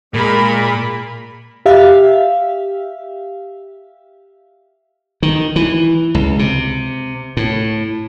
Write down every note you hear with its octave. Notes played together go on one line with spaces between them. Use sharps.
A#2 G#3 A#4 B5
G4 E5 F5
D#3
E3
C#2
C3
A2